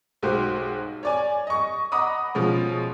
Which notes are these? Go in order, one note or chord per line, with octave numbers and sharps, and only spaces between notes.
B1 G#3 F#4 G4 C5
C#5 D5 G#5
D#5 C#6
D#5 F#5 A#5 B5 D6 D#6
B2 F3 G#3 C#4